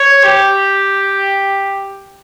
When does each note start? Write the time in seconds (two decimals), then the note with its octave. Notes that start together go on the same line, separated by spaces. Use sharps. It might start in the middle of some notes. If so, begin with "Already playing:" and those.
Already playing: C#5
0.24 G4